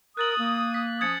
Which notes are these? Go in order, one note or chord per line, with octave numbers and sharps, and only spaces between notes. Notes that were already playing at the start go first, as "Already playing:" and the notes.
A#4 D#6 F#6 A6 F#7
A#3
B6
F3 C#4 D#6 G#6 A6 C#7